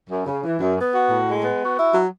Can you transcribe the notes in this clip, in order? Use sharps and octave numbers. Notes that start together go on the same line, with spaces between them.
F#2
C#3
E3
F#2
B3
F#4
A2
G#3
B3
F#4
E4
F#3